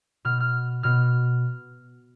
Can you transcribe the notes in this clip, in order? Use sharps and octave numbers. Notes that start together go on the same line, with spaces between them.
B2 F6
F6
B2 F6